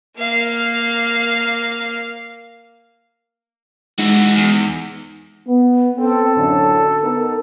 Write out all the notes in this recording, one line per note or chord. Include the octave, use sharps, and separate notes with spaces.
A#3 F5
E3 G#3 D#4 F#4
E2
B3
C4 A4
F#2 A2 D3
B3 D#4 A#4